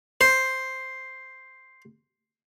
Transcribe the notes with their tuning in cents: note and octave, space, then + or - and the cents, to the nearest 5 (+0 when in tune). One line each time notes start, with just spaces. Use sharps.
C5 +0